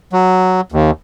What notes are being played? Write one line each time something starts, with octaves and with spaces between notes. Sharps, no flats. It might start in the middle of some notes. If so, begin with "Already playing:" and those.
F#3
D#2